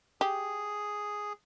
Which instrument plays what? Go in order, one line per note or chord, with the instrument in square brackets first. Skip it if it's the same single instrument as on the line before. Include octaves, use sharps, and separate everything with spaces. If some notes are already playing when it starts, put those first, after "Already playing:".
[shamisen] G4 [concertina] G#4